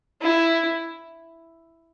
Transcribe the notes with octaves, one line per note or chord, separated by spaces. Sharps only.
E4